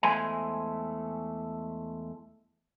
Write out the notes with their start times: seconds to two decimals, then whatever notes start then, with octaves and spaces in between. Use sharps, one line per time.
0.03 E2 G#3 A3 C5 G#5